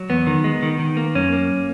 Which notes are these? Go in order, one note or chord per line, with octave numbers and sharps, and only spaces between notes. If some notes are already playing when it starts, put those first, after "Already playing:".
Already playing: F#3
E2 B3
D#3
G#3
D#3
D#3
A#3
F#2 C#4
A#3